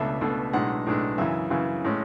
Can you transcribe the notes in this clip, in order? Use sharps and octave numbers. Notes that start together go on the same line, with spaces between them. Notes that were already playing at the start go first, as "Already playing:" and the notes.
Already playing: C#2 B2 A3 D4 E5
C#2 B2 A3 D4
B1 A2 G#3 D4 F#5
B1 A2 G#3 D4
F#2 C#3 E3 E5
F#2 C#3 E3
A2 G#3 C#4